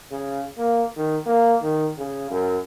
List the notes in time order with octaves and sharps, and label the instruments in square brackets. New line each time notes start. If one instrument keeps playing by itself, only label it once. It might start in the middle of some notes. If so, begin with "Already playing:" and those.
[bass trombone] C#3
A#3
D#3
A#3
D#3
C#3
F#2